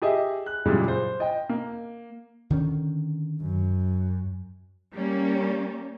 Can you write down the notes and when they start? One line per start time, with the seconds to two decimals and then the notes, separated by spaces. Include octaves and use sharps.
0.02 G4 G#4 D#5 E5
0.46 F#6
0.65 F#2 A#2 C#3 E3 G3 G#3
0.88 C5
1.20 D#5 G5
1.49 A#3
2.50 D3 D#3 C#4
3.42 F#2
4.93 G3 A#3 C#4